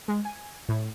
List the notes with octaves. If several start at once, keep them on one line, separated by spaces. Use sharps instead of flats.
G#3
G#5
A2